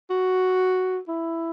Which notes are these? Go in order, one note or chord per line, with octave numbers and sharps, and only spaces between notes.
F#4
E4